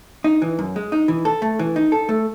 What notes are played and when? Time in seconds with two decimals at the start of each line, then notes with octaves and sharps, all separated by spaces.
0.24 D#4
0.42 E3
0.59 F#2
0.76 G#3
0.92 D#4
1.08 E3
1.25 A4
1.42 A3
1.59 E3
1.76 D#4
1.92 A4
2.09 A3